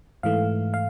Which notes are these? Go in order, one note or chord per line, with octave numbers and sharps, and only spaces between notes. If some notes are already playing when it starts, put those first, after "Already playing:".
G#2 E3 A3 F5
F5